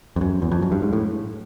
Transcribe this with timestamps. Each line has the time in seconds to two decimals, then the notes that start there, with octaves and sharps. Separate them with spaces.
0.16 F2
0.21 F#2
0.42 E2
0.52 F2
0.62 F#2
0.72 G2
0.82 G#2
0.93 A2